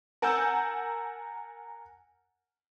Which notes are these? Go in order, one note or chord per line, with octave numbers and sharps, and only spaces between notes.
A#4 F#5 G#5 A5 E6 G6